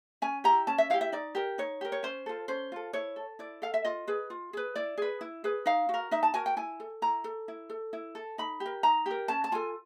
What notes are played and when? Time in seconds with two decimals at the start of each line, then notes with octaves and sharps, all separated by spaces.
0.22 C#4 G#5
0.44 E4 G4 A#5
0.67 C#4 A5
0.78 E5
0.90 E4 F5
0.93 G4
1.01 E5
1.12 D#4 D5
1.35 G4 A#4
1.58 D#4 C#5
1.81 G4 A#4
1.92 C#5
2.03 C#4 C5
2.26 F4 A4
2.48 C#4 C5
2.72 F4 A4
2.93 E4 C#5
3.16 A4
3.39 E4 D5
3.62 A4 F5
3.74 E5
3.85 F4 D#5
4.07 G#4 B4
4.30 F4
4.53 G#4 B4
4.76 E4 D5
4.97 G#4 B4
5.21 E4
5.44 G#4 B4
5.66 D#4 F5
5.89 F#4 A#4
6.11 D#4 E5
6.23 A5
6.34 F#4 A#4 G#5
6.46 G5
6.57 E4 G#5
6.80 A4
7.02 E4 A#5
7.24 A4
7.48 E4
7.70 A4
7.93 E4
8.15 A4
8.38 D#4 B5
8.60 G4
8.66 A#4
8.83 D#4 A#5
9.06 G4 A#4
9.28 C#4 A5
9.44 A5
9.52 F4 A4 G#5